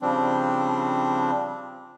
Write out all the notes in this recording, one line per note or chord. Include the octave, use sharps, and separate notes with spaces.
C#3 F3 G3 C4 D4